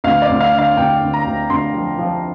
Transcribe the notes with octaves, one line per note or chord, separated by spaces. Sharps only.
D2 F5
D5
D2
F5
D3
F5
D2 G5
D2
A#5
D2
D2 C6
F3
F3